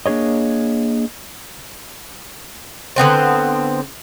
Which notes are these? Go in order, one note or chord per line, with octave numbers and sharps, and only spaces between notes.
A#3 D4 G#4 C#5 D#5
D3 B3 C4 C5